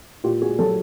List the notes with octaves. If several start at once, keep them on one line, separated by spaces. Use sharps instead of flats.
A#2 F4 G4
F#4 G#4
F#3 G4 A4